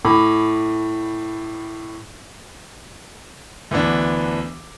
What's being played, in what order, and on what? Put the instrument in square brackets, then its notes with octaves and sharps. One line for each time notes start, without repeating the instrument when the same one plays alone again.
[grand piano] A2 B5 D6
D2 E3 B3 D4